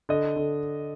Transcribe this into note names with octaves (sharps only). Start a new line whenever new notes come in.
D3 D#5
D3